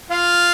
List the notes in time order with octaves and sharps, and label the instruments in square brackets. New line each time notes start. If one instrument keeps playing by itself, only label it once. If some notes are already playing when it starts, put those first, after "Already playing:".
[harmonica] F4 F5